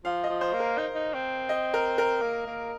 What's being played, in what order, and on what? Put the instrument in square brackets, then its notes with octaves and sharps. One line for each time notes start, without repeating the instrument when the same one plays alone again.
[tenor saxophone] F3 [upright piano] F5
[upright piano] D#5
[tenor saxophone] F3
[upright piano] C5
[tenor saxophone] A#3
[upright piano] A#4
[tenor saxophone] D#4 [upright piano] C5
[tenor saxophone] D#4
C4
[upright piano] D#5
A#4
A#4
[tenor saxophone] A#3
A#3